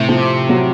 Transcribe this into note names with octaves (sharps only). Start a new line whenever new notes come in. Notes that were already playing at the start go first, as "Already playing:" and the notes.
Already playing: A2 C3 A3
F3
F#3